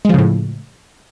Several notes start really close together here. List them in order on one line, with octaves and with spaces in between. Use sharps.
G#3 F3 C#3 A2